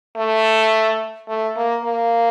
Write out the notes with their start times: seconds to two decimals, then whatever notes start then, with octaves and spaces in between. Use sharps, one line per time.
0.16 A3
1.28 A3
1.56 A#3
1.84 A#3